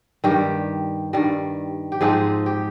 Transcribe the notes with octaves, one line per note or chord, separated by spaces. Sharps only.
G2 D#3 G3 G4
G2 D#3 G3
G4
G#2 F3 C4 D#4 G#4
G4